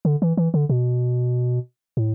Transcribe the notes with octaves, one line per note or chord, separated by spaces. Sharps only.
D3
E3
E3
D3
B2
A2